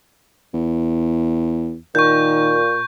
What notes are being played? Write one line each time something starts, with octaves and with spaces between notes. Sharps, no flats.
E2
A#2 D#3 C#6 G6